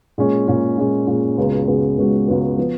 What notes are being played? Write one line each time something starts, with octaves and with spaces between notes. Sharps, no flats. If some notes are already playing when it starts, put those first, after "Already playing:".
A#2 G#3 C#4
A#2 G#3 C#4
A#2 G#3 C#4
A#2 G#3 C#4
C#2 C#3 G#3 B3 F#4
C#2 C#3 G#3 B3 F#4
C#2 C#3 G#3 B3 F#4
C#2 C#3 G#3 B3 F#4
F3 B3